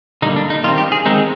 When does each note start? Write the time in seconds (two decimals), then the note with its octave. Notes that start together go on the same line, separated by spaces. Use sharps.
0.22 D3 G3 A#3 D#4
0.36 D4
0.50 D#4
0.64 D#3 G3 C4 F4
0.78 G4
0.92 G#4
1.05 D#3 G#3 C4 D#4